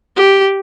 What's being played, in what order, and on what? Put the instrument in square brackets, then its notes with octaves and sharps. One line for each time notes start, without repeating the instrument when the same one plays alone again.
[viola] G4